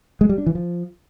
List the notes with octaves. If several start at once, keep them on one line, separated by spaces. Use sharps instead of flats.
G#3
G3
D4
E3
F3